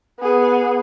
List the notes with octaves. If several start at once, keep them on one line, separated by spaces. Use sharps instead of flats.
B3 G#4